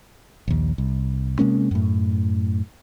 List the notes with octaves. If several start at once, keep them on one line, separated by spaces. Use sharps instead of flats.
A#1 D#2
C2
C3 G#3 A#3 C#4
F#2 A2